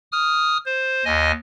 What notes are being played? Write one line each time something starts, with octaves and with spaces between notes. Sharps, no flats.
D#6 F6
C5
D#2 D#5 G#5